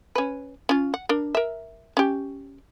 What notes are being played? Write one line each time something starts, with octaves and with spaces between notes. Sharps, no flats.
C#4 B4
C#4 F4
F#5
D4 A#4
A#4 E5
C#4 G4